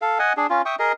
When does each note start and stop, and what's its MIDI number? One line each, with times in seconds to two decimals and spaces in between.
0.02 0.18 69
0.02 0.18 77
0.19 0.33 75
0.19 0.33 78
0.19 0.33 80
0.37 0.47 62
0.37 0.47 68
0.50 0.62 61
0.50 0.62 65
0.66 0.76 76
0.66 0.76 79
0.66 0.76 85
0.66 0.76 87
0.79 0.92 68
0.79 0.92 70
0.79 0.92 75